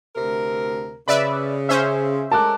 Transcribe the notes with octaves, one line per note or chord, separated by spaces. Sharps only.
D2 C3 A#4
C#3 B4 D5 E5
C#4 C5 E5
G#3 A4 A#4 A5 D6 F#6